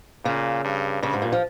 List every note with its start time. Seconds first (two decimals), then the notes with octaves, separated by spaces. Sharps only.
0.25 A#2 C#3
0.64 G2
1.02 G2 C#3
1.13 G#2
1.22 A#2
1.32 F3